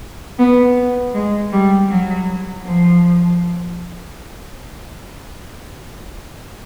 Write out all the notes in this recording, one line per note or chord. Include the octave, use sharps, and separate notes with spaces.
B3
G#3
G3
F#3
F3